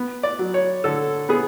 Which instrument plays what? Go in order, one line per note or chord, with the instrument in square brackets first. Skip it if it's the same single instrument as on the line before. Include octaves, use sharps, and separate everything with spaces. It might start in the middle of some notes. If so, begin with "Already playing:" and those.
Already playing: [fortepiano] B3
D5
F#3
C#5
D3 A4
B3 G#4